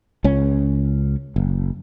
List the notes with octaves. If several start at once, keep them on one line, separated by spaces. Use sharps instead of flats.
C#2 C#4
F#1